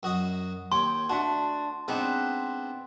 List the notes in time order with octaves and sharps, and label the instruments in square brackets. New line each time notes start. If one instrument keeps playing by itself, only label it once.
[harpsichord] F#2 F#4 D#5
[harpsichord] D#2 C#5 [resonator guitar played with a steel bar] G5 [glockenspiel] C6
[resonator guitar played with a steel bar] A3 D4 A5 [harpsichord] F#4
[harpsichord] G#3 C4 D4 [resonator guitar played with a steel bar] B3 D#4 B4